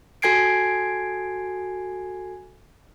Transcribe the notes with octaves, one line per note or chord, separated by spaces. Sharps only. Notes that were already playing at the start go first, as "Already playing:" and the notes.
F#4 A4 G#5 G#6 C7 D7